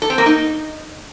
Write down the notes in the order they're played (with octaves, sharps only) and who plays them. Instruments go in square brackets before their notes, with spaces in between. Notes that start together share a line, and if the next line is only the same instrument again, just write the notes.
[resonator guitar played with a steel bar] A4
C4
A#3
D#4